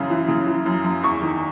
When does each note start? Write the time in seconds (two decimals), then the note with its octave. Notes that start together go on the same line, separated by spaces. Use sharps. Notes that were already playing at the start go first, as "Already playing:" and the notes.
Already playing: F#2 C#3 E3
0.10 E3
0.28 C#3
0.47 E3
0.66 F#2
0.84 F#2
1.03 E2 C#6
1.22 D#3